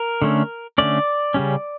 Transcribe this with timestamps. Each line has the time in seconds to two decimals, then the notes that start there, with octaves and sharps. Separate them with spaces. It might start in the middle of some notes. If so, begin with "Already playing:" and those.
Already playing: A#4
0.22 D3 A3 C#4
0.78 D3 A3 C#4 D5
1.34 C#3 G3 C#4